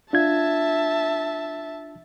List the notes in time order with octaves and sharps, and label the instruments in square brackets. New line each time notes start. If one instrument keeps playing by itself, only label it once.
[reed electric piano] D4 F4 G#6 [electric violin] E5 A5